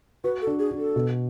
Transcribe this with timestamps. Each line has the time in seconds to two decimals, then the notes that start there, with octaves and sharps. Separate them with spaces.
0.24 F#4 B4
0.42 A4
0.47 D4
0.59 G#4
0.71 D4
0.78 A4
0.96 B2